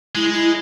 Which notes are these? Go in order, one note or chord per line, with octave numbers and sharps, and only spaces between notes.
G#3 E4
E4